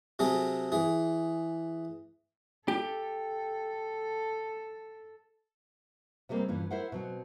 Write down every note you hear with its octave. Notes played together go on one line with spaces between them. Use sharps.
C3 F#3 G#4 A4
E3 G#4
G4 A4
C3 G3 G#3 A#3 C4
G2 A#2 E3 C#4
E4 A#4 C5 E5 F#5
B2 F#3 C4